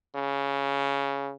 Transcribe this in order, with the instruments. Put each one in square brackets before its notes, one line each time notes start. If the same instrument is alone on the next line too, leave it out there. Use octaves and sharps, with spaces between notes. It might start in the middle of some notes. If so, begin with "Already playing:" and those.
[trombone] C#3